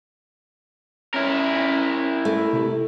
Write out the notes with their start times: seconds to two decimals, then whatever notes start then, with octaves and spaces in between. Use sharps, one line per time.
1.14 C#4 E4 A#4
2.25 A3
2.53 C3